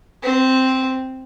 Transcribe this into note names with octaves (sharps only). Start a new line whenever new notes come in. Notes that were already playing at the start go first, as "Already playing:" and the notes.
C4